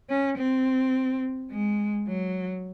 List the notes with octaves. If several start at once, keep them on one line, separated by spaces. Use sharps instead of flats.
C#4
C4
G#3
F#3